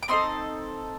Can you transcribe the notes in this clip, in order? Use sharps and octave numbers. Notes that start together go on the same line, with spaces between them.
D6
C4 D#4 A4 C6 D#6